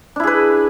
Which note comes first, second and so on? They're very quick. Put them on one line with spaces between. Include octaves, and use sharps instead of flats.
D4 E4 G#4 B4